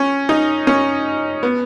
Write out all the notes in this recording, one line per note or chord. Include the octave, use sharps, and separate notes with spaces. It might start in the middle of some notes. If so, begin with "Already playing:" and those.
Already playing: C#4
D#4
C#4
B3